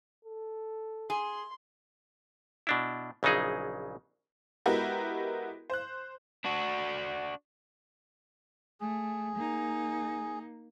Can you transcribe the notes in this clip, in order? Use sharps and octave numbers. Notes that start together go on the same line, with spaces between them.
A4
G#4 C6
B2 D4 E4
A#1 C#3 F#3 D#4 G#4
G#3 B3 E4 F#4 G4 A#4
C5 F#6
D4 F#4
A3 G#4
A#3 D#4